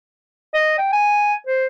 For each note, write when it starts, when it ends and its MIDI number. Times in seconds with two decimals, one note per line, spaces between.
0.54 0.76 75
0.78 0.89 79
0.93 1.34 80
1.46 1.66 72